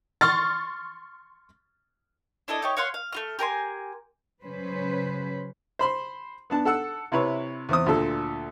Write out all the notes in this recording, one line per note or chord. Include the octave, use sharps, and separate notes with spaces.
C6 C#6 F6 A6
D4 E4 A4 D#5
D#4 G4 C#5
C#5 F5 F#5 C6
F5
A3 F4 F6
G4 A#4 G#5 C6
C#3 F#3 C#4 B4 C5
C5 B5 C6
B3 D4 A5
A4 F#5 E6
C3 E4 B4 C#5
E2 C4 D#6
D2 A#2 A4